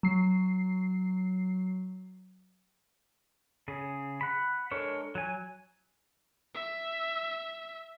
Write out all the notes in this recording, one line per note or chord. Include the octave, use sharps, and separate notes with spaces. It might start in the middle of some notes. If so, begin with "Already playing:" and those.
F#3 C7
C#3 G#4
F#5 B5
G#3 D4 A4 A#4 C#5
F#3 G#5
E5